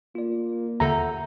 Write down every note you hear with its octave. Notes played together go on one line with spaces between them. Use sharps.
A#3 F4 D5
D#2 D3 A4 E5 F#5 A#5 G6